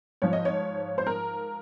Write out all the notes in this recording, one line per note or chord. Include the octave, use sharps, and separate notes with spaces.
G#2 F3 C#5
D#5
C#5
C5
A#4